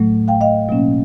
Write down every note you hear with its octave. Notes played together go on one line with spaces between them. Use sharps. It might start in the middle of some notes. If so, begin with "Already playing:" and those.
Already playing: A2 F#3 A3
F5 G5
D#5 F5
B2 F#3 A#3 C#4